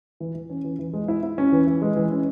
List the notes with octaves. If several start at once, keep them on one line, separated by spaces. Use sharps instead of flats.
E3
E3
C#4
E3
E3
G#3
E4
E4
C#4
E3
E3
G#3
E3
C#4